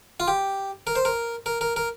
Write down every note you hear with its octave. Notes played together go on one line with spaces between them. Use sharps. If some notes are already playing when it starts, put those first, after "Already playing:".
F4
G4
A#4
C5
A#4
A#4
A#4
A#4